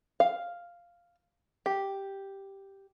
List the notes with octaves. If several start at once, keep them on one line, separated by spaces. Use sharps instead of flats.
F5
G4